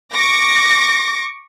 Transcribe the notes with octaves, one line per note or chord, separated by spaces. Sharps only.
C#6 D6 A#6